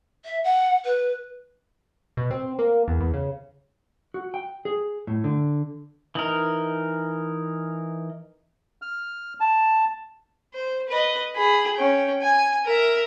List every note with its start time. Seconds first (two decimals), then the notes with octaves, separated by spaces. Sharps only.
0.25 E5
0.44 F#5
0.85 B4
2.17 B2
2.31 C4
2.59 A#3
2.88 E2
3.00 E2
3.14 C#3
4.14 F#4
4.34 G5
4.65 G#4
5.07 A2
5.24 D3
6.15 E3 D#4 A#4
8.82 F6
9.40 A5
10.54 C5
10.89 B4 D#5
11.35 G#4 B5
11.76 C#4 G5
12.22 G#5
12.65 A#4 E5